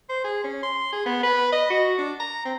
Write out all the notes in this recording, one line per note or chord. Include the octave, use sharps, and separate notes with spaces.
C5
G#4
C#4
C6
G#4
B3
B4
D#5
F#4
D4
A#5
C4